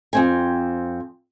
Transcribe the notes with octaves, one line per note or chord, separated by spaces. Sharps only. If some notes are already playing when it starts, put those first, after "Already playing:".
F2 C4 G#5